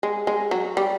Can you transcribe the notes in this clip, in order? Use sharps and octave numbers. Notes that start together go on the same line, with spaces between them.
G#3
G#3
F#3
G3